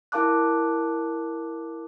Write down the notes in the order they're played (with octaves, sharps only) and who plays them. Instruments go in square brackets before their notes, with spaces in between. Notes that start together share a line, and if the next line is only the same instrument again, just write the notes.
[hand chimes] E4 A#4 F5 A5 D6 F#6